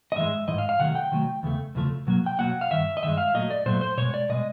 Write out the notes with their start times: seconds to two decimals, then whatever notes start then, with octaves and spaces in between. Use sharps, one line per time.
0.12 D#5
0.16 G#2 E3 G#3 E5
0.47 G#2 E3 D#5
0.58 F5
0.69 F5
0.79 C3 D#3 F#3 A3 F#5
0.95 G5
1.11 C3 D#3 F#3 A3
1.43 E2 C#3 A3
1.75 E2 C#3 F3 A3
2.07 B2 F#3 A#3
2.26 G5
2.39 B2 F#3 A#3 F#5
2.61 F5
2.70 G2 D#3 E5
2.97 D#5
3.03 G2 D#3 G#3 E5
3.18 F5
3.34 A#2 F#3 A3 D#5
3.51 D5
3.66 A#2 F#3 A3 C5
3.81 C5
3.98 B2 G#3 C#5
4.14 D5
4.29 B2 G#3 D#5